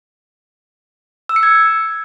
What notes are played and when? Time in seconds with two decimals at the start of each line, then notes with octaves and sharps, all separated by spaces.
1.29 E6
1.36 C#7
1.43 G#6